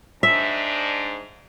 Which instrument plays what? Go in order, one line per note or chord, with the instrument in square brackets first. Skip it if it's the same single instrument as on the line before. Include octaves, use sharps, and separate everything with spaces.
[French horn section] G#2 D4 [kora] E5